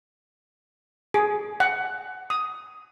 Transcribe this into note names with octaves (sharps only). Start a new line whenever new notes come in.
G#4
F#5
D#6